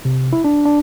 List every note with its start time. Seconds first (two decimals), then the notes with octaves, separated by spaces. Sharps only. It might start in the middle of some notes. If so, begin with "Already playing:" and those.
0.05 C3
0.33 E4
0.44 D4
0.65 D4